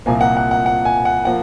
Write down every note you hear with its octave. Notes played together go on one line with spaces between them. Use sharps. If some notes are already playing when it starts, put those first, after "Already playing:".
C2 A#2 F3 A#3 G#5
F#5
F#5
F#5
F#5
G#5
F#5
F3 A#3 F#5